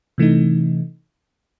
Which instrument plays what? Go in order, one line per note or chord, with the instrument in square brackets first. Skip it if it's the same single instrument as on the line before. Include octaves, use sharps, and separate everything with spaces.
[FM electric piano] C3 E3 A3 D#4